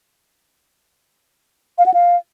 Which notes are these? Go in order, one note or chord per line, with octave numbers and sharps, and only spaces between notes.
F5
F#5
F5